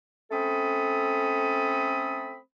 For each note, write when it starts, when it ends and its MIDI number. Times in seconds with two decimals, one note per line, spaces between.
0.32 2.37 57
0.32 2.37 60
0.32 2.37 61
0.32 2.37 69
0.32 2.37 83
0.32 2.37 87